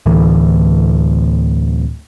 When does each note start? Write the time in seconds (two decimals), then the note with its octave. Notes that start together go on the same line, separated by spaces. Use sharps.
0.06 D2 A2 E3